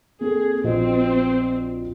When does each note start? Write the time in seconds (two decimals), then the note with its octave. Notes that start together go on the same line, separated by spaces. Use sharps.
0.21 A#3 C4 G#4 A4
0.64 A#1 C4 F#4 D#5